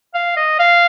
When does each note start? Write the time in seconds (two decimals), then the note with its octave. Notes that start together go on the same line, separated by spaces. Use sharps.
0.14 F5
0.37 D#5
0.59 F5